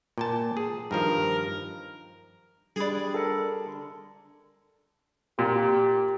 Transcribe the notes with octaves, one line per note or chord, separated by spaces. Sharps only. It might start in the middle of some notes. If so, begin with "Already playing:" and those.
A#2 G5 A5
G#4
G2 D#3 F3 A#4
G3 D4 G#4 D5 B5
A4 A#4 C#7
D3
A#2 G4